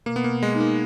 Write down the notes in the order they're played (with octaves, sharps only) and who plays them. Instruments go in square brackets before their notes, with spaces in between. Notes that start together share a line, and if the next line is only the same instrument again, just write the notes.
[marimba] B2 [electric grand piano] A#3
[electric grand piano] B3
A#3
[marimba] B2
[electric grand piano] G#3
[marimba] D#4
[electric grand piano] A#3